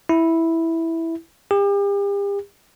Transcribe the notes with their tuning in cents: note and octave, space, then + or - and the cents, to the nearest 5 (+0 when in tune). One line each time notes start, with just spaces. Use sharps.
E4 -5
G4 +40